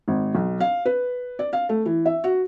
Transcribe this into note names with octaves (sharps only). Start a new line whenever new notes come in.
G#1
B1
F5
B4
D5
F5
A3
E3
E5
F#4